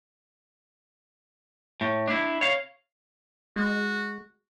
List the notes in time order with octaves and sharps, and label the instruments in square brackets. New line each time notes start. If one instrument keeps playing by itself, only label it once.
[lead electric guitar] A2
D4 E4
C#5 F5
[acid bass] G#3 [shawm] F#4